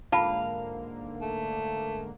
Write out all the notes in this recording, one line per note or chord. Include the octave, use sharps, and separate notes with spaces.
G#2 D3 A#3 F4 F5 A5 B5
A3